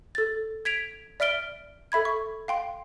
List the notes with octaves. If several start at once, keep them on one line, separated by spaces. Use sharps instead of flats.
A4 A6
G#6 B6 D7 F7
D5 E5 F6 D7 G7
A4 E5 B5 G#6
C#6
F5 G5 C6